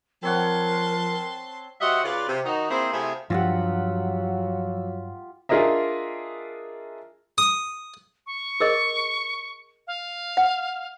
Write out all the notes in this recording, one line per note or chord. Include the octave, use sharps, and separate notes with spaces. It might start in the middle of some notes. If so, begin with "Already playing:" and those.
F3 C4 A#4 C#5 F#5 A5 C6
G3 F#4 C5 D#5 E5 F#5
C#3 F4 B4 D5
C3
D#3 D#4 F#4
A#3 C4 E4 G#4 C5
C3 A3 E4 F4 G#4
G2 F3 F#3 F4 G4 F#5 E6
D4 F4 G#4 A#4 D#5 E5
D#6
C#6
G#4 A#4 D#5
F5
F#5